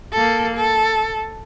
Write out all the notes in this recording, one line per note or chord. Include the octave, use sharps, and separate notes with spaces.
A#3 A4
A4